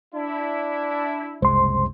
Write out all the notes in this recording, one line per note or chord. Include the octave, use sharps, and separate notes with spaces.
D4 E4
F#1 C2 G#3 C5 C6